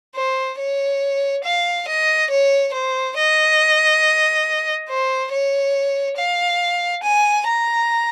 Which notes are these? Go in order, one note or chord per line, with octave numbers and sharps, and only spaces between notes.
C5
C#5
F5
D#5
C#5
C5
D#5
C5
C#5
F5
G#5
A#5